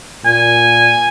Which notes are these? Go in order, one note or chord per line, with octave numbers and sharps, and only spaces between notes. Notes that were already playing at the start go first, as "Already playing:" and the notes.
A#2 G#5